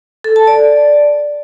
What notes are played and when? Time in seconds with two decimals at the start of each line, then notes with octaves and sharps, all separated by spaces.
0.24 A4
0.36 A5
0.47 D5